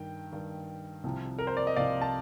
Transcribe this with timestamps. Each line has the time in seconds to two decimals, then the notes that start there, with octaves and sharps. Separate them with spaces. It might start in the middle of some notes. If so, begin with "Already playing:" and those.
Already playing: G2 D#3 G5
0.33 G2 D#3
1.04 C2 C3 F3
1.39 A#4
1.47 C5
1.57 D5
1.67 D#5
1.76 C2 C3 F3 D5 F5
2.01 A5